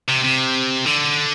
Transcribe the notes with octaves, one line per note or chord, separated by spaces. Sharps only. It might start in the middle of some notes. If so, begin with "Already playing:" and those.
C3
C3
D3